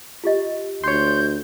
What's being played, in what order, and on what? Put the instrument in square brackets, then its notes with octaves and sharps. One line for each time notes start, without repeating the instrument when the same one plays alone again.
[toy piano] F4 G4 D#5
[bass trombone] D2 [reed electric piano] C#5 C6 [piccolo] G6